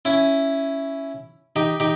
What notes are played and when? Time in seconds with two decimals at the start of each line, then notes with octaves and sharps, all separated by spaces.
0.05 C#4 E4
1.56 D#4 G4
1.80 D#4 G4